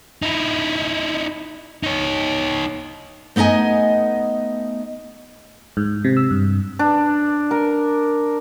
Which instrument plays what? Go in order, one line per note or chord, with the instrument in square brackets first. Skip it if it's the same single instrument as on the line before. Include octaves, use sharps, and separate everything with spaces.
[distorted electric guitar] D#4 E4
D#4 C#5
[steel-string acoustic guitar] A3 B3 D#4 D#5 G#5
[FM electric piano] G#2
C3
E6
G2
[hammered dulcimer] D4
A#4